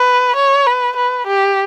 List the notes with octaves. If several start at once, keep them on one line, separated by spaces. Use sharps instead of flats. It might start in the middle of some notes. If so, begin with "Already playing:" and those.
Already playing: B4
C#5
B4
B4
G4